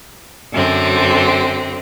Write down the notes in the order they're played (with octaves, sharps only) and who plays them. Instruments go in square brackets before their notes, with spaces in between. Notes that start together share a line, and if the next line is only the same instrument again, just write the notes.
[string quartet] F#2 D3 C4